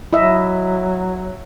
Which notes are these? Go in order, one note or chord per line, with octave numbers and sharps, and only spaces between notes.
F#3 E4 D#5 E5